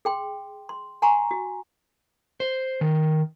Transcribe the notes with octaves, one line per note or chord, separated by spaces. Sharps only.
G#4 G5 C6
C6
F#5 G#5 A#5 C6 C#6
F#4
C5
D#3